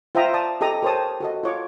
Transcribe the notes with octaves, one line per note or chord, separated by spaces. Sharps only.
F4 C5 E5 G5 A#5 D#6
D5 A5 D#6
G4 A4 D#5 A#5 D#6
G4 A#4 C5 C#5 A5 D#6
F#4 A4 D#5
F4 C#5 D6